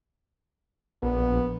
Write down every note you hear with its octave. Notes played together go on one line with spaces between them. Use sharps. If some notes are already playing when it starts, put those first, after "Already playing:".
A#1 B3